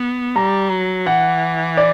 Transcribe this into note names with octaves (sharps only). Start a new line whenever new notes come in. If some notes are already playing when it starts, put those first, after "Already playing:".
Already playing: B3
G3 A#5
F#3
E3 F#5
D5